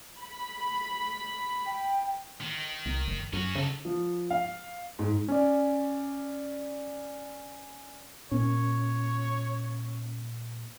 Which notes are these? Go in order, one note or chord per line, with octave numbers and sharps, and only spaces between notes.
B5
G5
D#3
C2
F#1
F#2 C#4 F#4
C#3 D#4 A4
F3
F5
G#2
C#4 D5
A#2 A#3 C#4 C#5